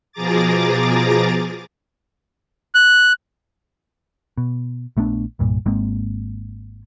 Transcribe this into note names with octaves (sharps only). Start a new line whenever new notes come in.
B2 F3 G#4 A#5 D6 A6
F#6
B2
A#1 A3 B3 D4
C2 G2 A#2
G#1 G#3 A#3 C4